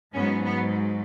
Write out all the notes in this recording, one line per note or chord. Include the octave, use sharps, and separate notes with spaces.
G#2 F#3 B3 C#4
B3